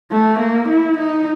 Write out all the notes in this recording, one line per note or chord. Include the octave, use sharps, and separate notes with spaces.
A3
A#3
E4
D#4